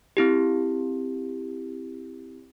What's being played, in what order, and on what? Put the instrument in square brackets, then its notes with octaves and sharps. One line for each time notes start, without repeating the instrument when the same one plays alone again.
[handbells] C4 E4 G4